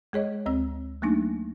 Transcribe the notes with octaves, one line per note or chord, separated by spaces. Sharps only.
G#3 G#4 C#5 D#5
D2 C4 E6
F#3 A3 A#3 D4 D#4